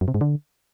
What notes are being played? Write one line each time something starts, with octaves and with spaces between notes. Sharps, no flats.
F#2
C3
G#2
D3